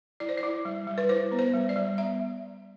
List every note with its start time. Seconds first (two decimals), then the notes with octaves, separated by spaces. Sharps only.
0.20 E4 D5
0.29 C5
0.37 D5
0.43 E4
0.65 G3
0.87 G3
0.98 B4
1.09 E4 C5
1.32 B3
1.39 C5
1.54 G3
1.69 D5
1.76 G3
1.98 B3 E5